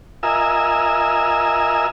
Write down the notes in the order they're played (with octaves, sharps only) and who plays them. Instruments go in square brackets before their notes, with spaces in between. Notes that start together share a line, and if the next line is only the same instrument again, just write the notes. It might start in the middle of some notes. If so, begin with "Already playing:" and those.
[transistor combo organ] F4 A#4 D#5 E5 G#5 E6